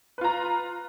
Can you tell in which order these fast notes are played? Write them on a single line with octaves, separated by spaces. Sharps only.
B4 F4 A#5